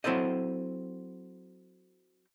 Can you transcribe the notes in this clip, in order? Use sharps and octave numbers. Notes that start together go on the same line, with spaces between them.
F#3 C4 E4 A4 C5 D#5